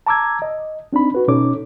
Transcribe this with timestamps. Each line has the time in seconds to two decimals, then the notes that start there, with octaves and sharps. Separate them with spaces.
0.07 A5 A#5 D6 E6 G#6
0.42 D#5
0.93 C4 D4 D#4 B5
1.15 F#4 B4
1.28 B2 C#4 D#4 A4 C#5 D6